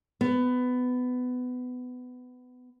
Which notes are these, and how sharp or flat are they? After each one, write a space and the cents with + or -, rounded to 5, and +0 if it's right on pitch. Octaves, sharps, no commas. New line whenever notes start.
B3 +20